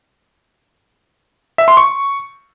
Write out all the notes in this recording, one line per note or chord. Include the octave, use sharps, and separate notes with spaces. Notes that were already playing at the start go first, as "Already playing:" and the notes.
E5
C6
C#6